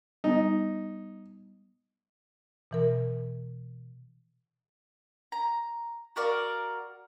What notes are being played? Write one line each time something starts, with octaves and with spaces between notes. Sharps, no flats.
G3 B3 D#4
B2 E3 A#4
A#5
F#4 A#4 D5 F5